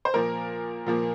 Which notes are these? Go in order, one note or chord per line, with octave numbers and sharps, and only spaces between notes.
C5
A#2 F3 A#3 A#4
A#2 F3 A#3